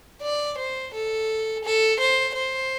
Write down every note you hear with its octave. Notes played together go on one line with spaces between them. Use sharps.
D5
C5
A4
A4
C5
C5